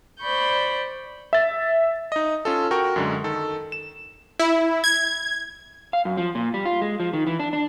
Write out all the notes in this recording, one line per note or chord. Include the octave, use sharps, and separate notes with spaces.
C5 D5 B5 C#6 G6
E5 A6
D#4 D#5
C#4 F4 A4
F#4 A#4 G5 C#6
F#2 D3 G#3
D#3 A4
E7
E4
G#6
F5
F#2
F3
A#2
G3
F4
G#3
F3
D#3
E3
D4
D4